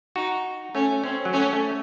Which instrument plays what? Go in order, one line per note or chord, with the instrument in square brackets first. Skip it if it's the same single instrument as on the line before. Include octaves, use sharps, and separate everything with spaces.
[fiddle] D#4 [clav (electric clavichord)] F#4
[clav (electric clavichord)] A3 [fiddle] C#4
[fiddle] C4 [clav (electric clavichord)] C#4
[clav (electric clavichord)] F#3
[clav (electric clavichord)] A3 [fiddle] C#4
[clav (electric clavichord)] A3